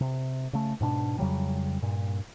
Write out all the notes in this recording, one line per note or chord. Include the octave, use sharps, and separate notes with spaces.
C3
C#3 A3
G#2 B2 C#4 D4
F2 C#3 F#3 G3
G2 A#2